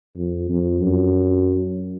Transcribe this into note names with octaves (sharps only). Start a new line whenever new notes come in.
F2
F2
F#2